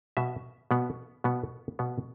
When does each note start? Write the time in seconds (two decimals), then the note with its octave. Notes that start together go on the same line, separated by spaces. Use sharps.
0.17 B2 B3 E5
0.71 B2 B3
1.24 B2 B3
1.79 B2 B3